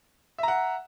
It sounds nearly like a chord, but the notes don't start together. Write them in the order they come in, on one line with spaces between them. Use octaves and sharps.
E5 A#5 F#5